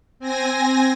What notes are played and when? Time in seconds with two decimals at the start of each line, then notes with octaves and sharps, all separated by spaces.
0.19 C4 G#5 A#6